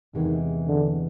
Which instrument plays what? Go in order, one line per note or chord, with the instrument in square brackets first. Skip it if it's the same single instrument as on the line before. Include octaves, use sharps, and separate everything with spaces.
[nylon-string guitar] E2 C3 E3 G#3 [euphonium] D#3
[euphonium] D3